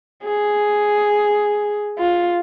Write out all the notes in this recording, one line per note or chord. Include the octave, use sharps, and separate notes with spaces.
G#4
F4